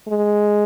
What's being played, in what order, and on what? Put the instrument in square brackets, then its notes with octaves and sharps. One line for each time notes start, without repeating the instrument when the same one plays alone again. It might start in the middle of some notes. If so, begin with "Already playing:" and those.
[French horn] G#3